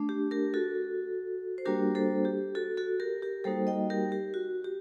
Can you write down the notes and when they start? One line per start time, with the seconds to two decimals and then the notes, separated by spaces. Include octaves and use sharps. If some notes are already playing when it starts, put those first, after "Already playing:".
Already playing: A3 D4
0.09 G4
0.31 G4 A#4
0.54 F#4 A4
1.58 C5
1.66 G3 A#3 D4 F#4 G4 A#4
1.95 A4 C5
2.25 G4
2.55 F#4 A4
2.77 F#4 A4
3.00 G4 A#4
3.22 G4 A#4
3.44 G3 A#3 D#4 F#4 A4 C5
3.67 D#5 G5
3.90 G4 A#4
4.12 G4
4.34 F#4
4.64 G4